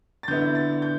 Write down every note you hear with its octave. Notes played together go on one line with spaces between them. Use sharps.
A6
D3 B3 E4 G6
A6
G6